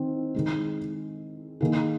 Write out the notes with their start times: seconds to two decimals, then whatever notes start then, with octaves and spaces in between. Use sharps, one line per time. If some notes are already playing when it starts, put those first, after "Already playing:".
Already playing: D#3 C4
0.34 D#3 G#3 D#4
1.61 D#3 A#3 G#4